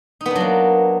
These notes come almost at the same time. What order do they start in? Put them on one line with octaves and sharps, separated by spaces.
D#4 B3 D4 F#3 A#3